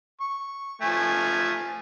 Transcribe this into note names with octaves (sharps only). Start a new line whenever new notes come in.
C#6
F3 A3 G#5